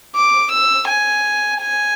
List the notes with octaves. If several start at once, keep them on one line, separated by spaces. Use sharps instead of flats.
D6
E6
G#5
G#5